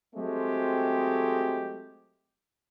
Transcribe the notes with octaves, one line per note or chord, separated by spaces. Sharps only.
F#3 G#3 A3 C4 G4